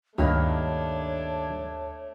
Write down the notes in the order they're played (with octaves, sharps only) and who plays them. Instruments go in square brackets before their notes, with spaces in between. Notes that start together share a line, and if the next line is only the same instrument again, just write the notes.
[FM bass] D2 [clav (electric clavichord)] G2 D#3 A#3 [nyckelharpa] A3 D4 [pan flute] C#5